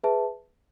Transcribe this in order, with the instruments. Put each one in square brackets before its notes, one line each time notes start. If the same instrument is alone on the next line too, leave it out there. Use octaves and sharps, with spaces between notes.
[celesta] G#4 B4 E5 A5